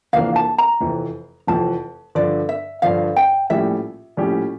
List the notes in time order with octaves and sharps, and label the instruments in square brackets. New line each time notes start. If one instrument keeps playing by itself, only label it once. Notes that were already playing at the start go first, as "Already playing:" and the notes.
[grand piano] F1 F2 E3 A#3 D4 [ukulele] F5
[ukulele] A5
A#5
[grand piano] F1 F2 E3
[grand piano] F1 F2 E3 [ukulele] A5
[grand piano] G2 D3 F3 [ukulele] D5
[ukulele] E5
[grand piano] G2 D3 F3 [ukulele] F5
[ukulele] G5
[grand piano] A#1 A2 G3 C#4 G4 [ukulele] E5
[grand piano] A#1 A2 G3 C#4 G4